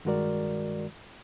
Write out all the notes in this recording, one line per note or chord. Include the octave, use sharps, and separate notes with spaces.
G2 D#3 G#3 F#4 A#4 D5